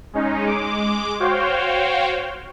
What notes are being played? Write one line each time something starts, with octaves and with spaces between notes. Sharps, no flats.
G#3 C#4 D#4
G#3 D6
F#4 C5 C#5 F5 G5